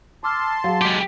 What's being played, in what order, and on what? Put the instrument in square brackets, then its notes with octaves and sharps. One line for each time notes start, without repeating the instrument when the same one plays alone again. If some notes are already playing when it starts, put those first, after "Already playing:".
[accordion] A5 C6 [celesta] D6 E6 F6
[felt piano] F#3 [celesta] G#4 F5
[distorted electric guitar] G#3 G4 [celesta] B6